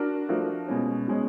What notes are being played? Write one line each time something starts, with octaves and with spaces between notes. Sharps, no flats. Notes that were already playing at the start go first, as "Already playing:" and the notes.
Already playing: D4 F#4 A#4
F3 A3 D4 F#4 A#4
B2 G#3 C#4
B2 G#3 C#4